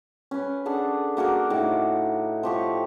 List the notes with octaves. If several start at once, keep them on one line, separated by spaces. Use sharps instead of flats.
C#4 B4
D4 G#4 A4 F#5
A#3 F#4 G#4 A#4
A2 D#4 D6
F3 G4 C#6